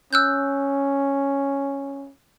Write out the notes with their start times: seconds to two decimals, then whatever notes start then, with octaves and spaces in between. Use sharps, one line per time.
0.13 C#4 E6 F#6 G6